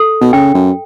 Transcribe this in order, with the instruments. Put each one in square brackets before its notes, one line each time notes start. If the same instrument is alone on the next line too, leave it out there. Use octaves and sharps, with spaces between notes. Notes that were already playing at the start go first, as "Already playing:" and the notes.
Already playing: [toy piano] A4
[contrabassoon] B2
[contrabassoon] C#3 [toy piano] G5
[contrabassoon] F#2